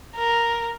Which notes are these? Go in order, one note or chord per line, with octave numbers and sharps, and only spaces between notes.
A#4